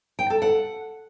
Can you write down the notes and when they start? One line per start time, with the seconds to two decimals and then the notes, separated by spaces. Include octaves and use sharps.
0.19 G5
0.30 A4
0.42 F#5